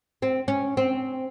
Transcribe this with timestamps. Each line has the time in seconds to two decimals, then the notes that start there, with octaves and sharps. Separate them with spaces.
0.22 C4
0.48 C#4
0.77 C4